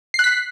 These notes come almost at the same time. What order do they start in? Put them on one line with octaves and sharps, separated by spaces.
C7 F#6 B6